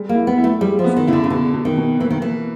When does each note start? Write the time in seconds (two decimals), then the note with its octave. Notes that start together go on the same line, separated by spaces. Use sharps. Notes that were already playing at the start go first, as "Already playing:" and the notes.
Already playing: G3 G#3
0.09 A#3
0.15 E4
0.27 B3
0.38 E4
0.44 A3
0.61 G3 G#3
0.79 F3
0.84 B3
0.97 D#3
1.07 C#3 E4
1.13 D3
1.24 C#3
1.30 B2 D3
1.54 B2
1.65 D#3
1.77 B2
2.00 E3 A#3
2.11 D#3
2.22 E3 A#3